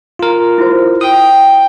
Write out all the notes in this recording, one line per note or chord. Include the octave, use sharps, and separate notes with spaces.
F4 A#4
E4 F#4 C5
G5 D#6